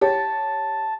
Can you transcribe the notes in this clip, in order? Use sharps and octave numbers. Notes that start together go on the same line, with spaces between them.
G4 C#5 A5